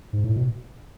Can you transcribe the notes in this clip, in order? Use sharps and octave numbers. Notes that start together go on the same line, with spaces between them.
G#2
A2
B2